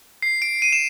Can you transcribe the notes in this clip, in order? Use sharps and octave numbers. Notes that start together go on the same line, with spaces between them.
C7
D7
D#7
E7